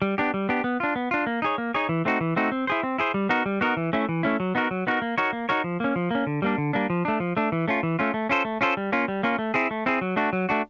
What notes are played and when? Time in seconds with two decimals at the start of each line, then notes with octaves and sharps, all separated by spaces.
0.02 G3
0.18 B3 D4 G4
0.34 G3
0.49 B3 D4 G4
0.64 B3
0.80 D4 F4
0.96 B3
1.11 D4 F4
1.27 A#3
1.42 D#4 G#4 C#5
1.58 A#3
1.74 D#4 G#4 C#5
1.89 E3
2.05 A3 C4 D#4 F#4
2.21 E3
2.36 A3 C4 D#4 F#4
2.52 C4
2.67 E4 G#4 C5
2.83 C4
2.98 E4 G#4 C5
3.14 G3
3.29 B3 D#4 F#4 A#4
3.46 G3
3.61 B3 D#4 F#4 A#4
3.77 E3
3.93 A3 C#4 E4
4.09 E3
4.23 A3 C#4 E4
4.40 F#3
4.55 B3 D#4 F#4 A#4
4.71 F#3
4.87 B3 D#4 F#4 A#4
5.02 A#3
5.18 D#4 F#4 A#4 C#5
5.33 A#3
5.49 D#4 F#4 A#4 C#5
5.64 F3
5.80 A#3 C#4
5.96 F3
6.11 A#3 C#4
6.27 D3
6.42 G3 A#3 D4
6.58 D3
6.73 G3 A#3 D4
6.90 F3
7.05 A3 D4
7.20 F3
7.37 A3 D4
7.52 E3
7.68 A3 C#4 F4
7.83 E3
7.99 A3 C#4 F4
8.14 A3
8.29 C#4 F4 A4 C5
8.45 A3
8.61 C#4 F4 A4 C5
8.77 G3
8.92 A#3 C#4 F4
9.08 G3
9.23 A#3 C#4 F4
9.39 A3
9.54 C4 E4 G#4
9.71 A3
9.86 C4 E4 G#4
10.01 F#3
10.16 A3 D4 F#4
10.33 F#3
10.49 A3 D4 F#4